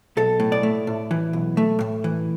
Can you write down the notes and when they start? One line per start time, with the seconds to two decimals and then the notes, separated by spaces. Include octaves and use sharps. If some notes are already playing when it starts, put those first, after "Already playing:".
0.17 B1 A4
0.40 A2
0.52 D5
0.63 A3
0.87 A2
1.11 E3
1.33 B1
1.57 A3
1.81 A2
2.04 E3